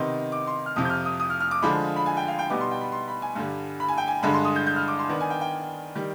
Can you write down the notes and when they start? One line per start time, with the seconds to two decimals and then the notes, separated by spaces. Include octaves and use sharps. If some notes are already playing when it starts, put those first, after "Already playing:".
Already playing: C3 D#3 B3 D#4 C6
0.32 D6
0.47 C6
0.66 F6
0.76 F2 C3 F3 D#6
0.85 G6
0.90 F6
1.05 D#6
1.20 D#6
1.30 F6
1.40 F6
1.51 D6
1.62 D3 F3 G#3 B5
1.96 B5
2.06 G#5
2.17 G5
2.28 F5
2.39 G5
2.50 B2 G3 B3 D#4 D6
2.61 C6
2.71 G5
2.81 B5
2.92 C6
3.08 B5
3.22 G#5
3.35 G2 D3 G3
3.80 B5
3.88 G#5
3.98 G5
4.08 G#5
4.23 G2 D3 G#3 B5
4.34 C6
4.45 D#6
4.56 G6
4.67 G6
4.76 F6
4.88 D6
4.99 C6
5.09 D#3 B3 D4
5.21 G#5
5.30 G5
5.41 G5
5.95 D#3 G3